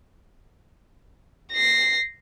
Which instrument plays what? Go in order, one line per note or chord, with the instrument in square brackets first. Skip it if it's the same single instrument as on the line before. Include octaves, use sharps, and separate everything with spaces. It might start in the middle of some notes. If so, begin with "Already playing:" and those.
[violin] A#6 C7